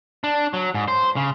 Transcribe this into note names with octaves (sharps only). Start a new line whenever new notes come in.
D4
F#3
G#2
C5
C#3